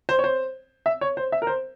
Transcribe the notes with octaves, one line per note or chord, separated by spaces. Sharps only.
C5
C#5
C5
E5
C#5
C5
E5
A#4
C5